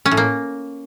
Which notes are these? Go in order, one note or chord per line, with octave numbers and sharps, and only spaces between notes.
C#4
A2
A#3